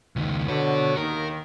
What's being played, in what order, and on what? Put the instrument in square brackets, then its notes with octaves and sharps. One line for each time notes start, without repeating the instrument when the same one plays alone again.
[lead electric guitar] C#2 D#3
[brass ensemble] D3 C#5 [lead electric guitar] F#4 B4
[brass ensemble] D#2 D#3 [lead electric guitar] A#4